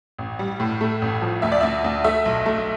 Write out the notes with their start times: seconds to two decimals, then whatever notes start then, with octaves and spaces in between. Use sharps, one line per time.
0.19 A1
0.39 G3
0.60 A2
0.81 A3
1.02 A1
1.22 F3
1.42 D2 E5
1.52 D5
1.61 D2 E5
1.84 D2
2.04 A3 E5
2.25 B1
2.46 A3